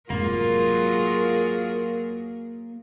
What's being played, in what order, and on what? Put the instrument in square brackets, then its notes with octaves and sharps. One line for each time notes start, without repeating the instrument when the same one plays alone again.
[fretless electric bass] F1 G#2 [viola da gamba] F#3 G#4 A#4 [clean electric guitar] A#3 [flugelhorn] F4